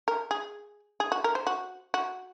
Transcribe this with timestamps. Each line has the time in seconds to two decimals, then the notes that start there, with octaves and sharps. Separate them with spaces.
0.08 A#4
0.31 G#4
1.00 G#4
1.12 F#4
1.24 A#4
1.35 C5
1.47 F#4
1.94 F#4